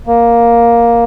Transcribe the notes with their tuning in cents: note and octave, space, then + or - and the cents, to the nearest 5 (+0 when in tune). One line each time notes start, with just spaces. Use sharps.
A#3 +5